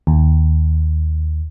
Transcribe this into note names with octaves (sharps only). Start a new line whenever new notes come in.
D#2